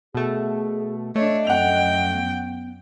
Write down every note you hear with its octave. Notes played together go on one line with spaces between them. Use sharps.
B2 A3 G#4
A3 D4 C#5 D#5
F#2 F#5 G5 F7
B3